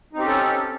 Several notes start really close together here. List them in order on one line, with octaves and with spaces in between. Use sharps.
D#4 C4 G4 C#4 A4